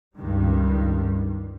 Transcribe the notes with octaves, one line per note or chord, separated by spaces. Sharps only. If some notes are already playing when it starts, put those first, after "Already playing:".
C#2 G2 D#3 G3